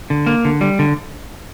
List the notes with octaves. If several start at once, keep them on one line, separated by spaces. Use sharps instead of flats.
D3
A#3
D3
G3
D3